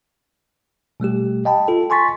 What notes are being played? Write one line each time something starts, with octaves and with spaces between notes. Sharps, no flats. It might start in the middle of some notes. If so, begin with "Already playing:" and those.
B2 G3 A3 G4
D#5 G5 A5 B5
F4 A4
G#5 C6 C#6 A6 B6